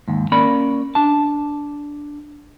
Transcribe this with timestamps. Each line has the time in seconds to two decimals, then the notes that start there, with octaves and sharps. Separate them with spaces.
0.08 D#2 G#2
0.32 A#3 C#4 A#4 D5 B5
0.95 D4 A5